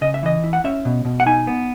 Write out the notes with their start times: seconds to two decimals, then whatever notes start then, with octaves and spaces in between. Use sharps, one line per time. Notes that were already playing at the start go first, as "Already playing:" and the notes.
0.01 C#3 D#5
0.14 E5
0.23 E3 D#5
0.44 E4
0.53 F#5
0.64 C#4 E5
0.85 B2
1.05 B2
1.20 F#5
1.26 D#4 G#5
1.47 B3